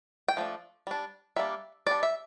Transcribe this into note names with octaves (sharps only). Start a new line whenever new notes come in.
G5
F3 A3 D4
G3 D4
G3 A#3 D4 E5
G3 D4 D5
E5